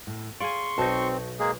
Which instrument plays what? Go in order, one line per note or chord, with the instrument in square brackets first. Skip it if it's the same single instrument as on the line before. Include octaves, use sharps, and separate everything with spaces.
[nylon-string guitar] A2
[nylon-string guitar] G#4 F5 [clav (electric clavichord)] D5 G#5 [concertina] C6 C#6
[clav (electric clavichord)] B1 D#4 [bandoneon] C4 [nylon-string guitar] F#4 A5
[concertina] G#3 A#3 [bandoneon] G#4